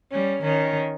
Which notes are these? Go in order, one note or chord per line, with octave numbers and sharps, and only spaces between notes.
G3 C#4
D#3 C#4